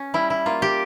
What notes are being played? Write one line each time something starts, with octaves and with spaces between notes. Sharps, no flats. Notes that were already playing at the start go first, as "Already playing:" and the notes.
Already playing: C#4
G3 E4
E4
A#3 F4
G4